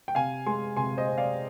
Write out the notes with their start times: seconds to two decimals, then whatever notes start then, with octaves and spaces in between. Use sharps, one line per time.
0.08 G5
0.15 C3 F5 G#5
0.46 G#3 G#5 C6
0.76 C3 G#5 C6
0.97 C5 D#5
1.08 C4
1.18 D5 F5